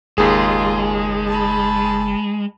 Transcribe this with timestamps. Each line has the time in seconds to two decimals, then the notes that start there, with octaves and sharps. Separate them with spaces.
0.18 F#1 D#2 G#3 F4 G#4
1.27 A5 B5